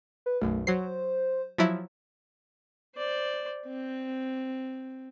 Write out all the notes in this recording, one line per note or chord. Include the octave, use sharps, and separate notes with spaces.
B4
B1 F#2 A3
F#3 C5 C7
F3 F#3 E4
C5 D5
C4